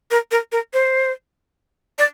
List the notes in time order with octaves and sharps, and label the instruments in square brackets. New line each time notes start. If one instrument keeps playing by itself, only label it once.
[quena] A#4
A#4
A#4
C5
D5